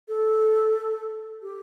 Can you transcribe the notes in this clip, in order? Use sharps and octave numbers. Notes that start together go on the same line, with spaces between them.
A4
G4